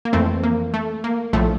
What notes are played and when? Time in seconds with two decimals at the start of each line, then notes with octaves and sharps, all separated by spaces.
0.05 A#3
0.13 F2 E3 A3 C4
0.44 A#3
0.74 A3
1.04 A#3
1.33 A#1 A2 F3 A3